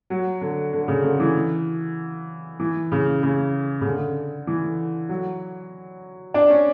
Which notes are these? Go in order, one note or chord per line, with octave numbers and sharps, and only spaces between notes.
F#3
D3
D3
C#3
D3
E3
E3
C#3
C#3
C#3
D3
E3
F#3
D4
C#4